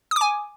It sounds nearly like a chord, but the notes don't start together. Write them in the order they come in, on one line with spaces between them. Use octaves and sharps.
D#6 D6 G#5